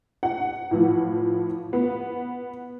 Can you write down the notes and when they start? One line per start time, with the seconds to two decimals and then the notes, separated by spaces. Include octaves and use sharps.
0.23 F#5
0.71 A2 E3 F3
1.73 B3